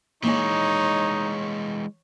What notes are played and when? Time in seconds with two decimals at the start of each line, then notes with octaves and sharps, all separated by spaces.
0.24 E3 G#3 A#3 C#4 D#4 C#5 G#5